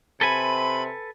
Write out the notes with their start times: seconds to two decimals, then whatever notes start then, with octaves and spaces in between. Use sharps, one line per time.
0.21 C3 A4 B4 G#5 B5